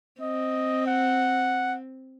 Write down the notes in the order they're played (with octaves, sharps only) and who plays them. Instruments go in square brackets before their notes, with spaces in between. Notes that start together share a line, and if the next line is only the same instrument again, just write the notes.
[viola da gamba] C4 [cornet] D#5
[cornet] F#5